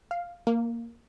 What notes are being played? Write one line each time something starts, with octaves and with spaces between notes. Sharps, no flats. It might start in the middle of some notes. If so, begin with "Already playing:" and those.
F5
A#3